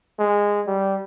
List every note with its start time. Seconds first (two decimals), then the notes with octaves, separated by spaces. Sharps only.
0.19 G#3
0.67 G3